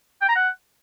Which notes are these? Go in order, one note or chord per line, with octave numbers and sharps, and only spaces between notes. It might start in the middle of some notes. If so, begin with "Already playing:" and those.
G5
A#5
F#5